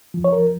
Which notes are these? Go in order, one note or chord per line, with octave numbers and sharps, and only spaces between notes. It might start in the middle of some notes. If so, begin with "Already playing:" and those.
F2 F3
C#5
A#4